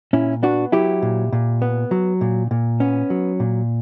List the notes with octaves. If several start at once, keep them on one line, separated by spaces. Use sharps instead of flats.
A#2 C#4 E4
B3 D4 F#4
F#3 E4 G4
A#2
A#2
B3
F#3
A#2
A#2
B3 C#4
F#3
A#2